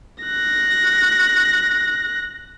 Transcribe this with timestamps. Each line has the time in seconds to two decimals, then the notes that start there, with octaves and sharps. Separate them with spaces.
0.24 F#6 A#6